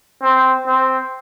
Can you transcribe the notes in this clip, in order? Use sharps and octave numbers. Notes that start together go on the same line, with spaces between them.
C4
C4